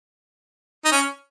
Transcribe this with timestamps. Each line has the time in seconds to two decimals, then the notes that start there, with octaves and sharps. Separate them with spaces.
0.85 D#4
0.92 C#4